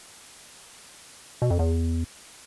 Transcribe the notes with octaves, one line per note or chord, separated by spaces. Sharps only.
B2
F2
E2